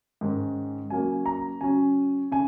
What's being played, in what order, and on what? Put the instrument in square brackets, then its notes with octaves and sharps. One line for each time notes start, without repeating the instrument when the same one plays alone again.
[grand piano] G#2 D#3 G#3 C#4
C#3 F#3 A#3 C#4 G#5
A#5
C#3 F#3 C#4 G#5
C#3 G#5